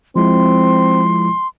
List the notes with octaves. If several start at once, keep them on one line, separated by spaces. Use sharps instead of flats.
F3 G#3 C4 E4 C6